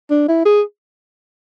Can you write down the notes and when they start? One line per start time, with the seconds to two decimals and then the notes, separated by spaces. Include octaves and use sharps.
0.10 D4
0.28 E4
0.45 G#4